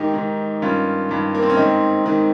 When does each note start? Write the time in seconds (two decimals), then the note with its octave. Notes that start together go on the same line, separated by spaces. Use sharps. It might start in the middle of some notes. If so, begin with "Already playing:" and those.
Already playing: G#2 D#3 D#4 G4
0.14 G#2 D#3
0.62 G2 D#3 C#4 F4
1.09 G2 D#3
1.35 A#3
1.43 C4
1.50 C#4
1.57 G#2 D#3 C4 D#4
2.06 G#2 D#3